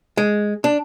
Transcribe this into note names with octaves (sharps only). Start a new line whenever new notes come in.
G#3
D4